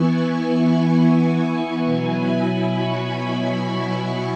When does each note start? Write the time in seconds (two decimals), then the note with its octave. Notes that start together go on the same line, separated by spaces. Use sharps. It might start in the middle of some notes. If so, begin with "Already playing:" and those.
Already playing: E3 B3 E4 G#5 C#6
0.67 G#5
0.96 G#5
1.85 B2 F#3 E4 G#5
2.16 B5
2.45 B5
2.75 C#6